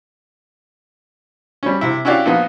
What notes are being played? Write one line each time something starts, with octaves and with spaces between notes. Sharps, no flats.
G3 C#4
C3 E4
C#4 E4 F#4 G4 D5 F5
A#2 F3 A#3 B3 D#4